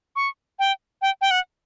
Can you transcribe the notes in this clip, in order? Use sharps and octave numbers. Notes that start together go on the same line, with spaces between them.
C#6
G5
G5
G5
F#5